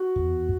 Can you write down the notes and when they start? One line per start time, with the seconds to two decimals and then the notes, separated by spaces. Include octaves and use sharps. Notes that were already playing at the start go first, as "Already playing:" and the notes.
Already playing: F#4
0.16 E2